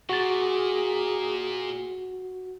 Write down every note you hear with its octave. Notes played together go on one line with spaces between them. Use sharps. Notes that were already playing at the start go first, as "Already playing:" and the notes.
A#2 F#4 G#4 A6